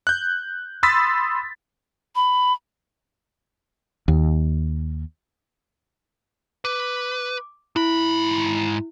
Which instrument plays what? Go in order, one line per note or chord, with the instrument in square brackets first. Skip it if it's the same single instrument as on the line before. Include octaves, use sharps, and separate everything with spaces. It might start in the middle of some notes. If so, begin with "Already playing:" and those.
[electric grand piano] F#6 G6
B5 C6 D#6 E6 A6 B6
[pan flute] B5
[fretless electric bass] D#2
[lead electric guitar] B4 [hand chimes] D6
[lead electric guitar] G#2 B5 [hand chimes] E4